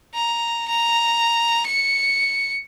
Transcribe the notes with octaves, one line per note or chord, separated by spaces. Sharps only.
A#5
A#5
C#7